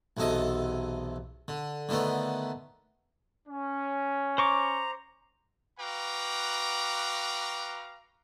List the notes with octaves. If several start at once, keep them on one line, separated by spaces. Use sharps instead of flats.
B1 E2 C3 A4 D#5
D3
D3 D#3 A3 B3
C#4
C5 A#5 C#6 D6
F#4 B4 F5 G5 A#5 D6